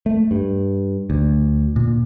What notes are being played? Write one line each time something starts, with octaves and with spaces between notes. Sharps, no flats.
A3
G2
D2
A#2